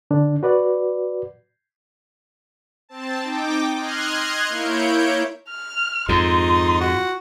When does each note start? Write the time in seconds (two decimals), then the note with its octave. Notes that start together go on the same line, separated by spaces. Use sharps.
0.11 D3 D4
0.43 F#4 B4 D5
2.89 C4 A5
3.23 D#4 G5 D6
3.75 D#5 C6 F6 F#6 G#6
4.49 A#3 E4 C#5 G6 D7
5.49 F6
6.09 F2 G#2 D#4 F4 C6
6.81 F#4